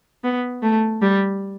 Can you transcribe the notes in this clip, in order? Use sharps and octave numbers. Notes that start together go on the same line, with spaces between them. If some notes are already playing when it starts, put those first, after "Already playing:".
B3
A3
G3